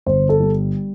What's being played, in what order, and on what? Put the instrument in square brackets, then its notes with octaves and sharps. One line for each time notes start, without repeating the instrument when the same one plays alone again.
[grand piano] G1 C5
A4
G3